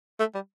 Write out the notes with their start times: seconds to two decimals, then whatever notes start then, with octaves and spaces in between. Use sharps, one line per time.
0.20 A3
0.35 G3